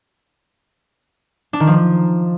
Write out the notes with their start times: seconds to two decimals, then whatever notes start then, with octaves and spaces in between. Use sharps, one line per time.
1.53 D4
1.60 D#3
1.67 F3